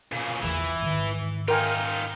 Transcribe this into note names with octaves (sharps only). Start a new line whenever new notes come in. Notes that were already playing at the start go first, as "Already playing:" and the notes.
A#2 C#3
A1 E2 E3
G#2 D#3
D#4 F4 A#4 G5 G#5